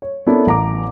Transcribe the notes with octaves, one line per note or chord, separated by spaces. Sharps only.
C#5
B3 C#4 D4 E4 A4 A#4
A1 A#5 D6